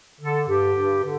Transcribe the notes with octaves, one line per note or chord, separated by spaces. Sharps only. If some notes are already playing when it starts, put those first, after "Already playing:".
D3 A4
G2 G4
G2
D3